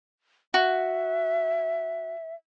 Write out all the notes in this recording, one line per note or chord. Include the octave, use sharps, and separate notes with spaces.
F#4 E5